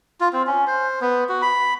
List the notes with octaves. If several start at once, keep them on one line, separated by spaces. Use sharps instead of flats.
F4
C4
C#4
C5
B3
F#4
B5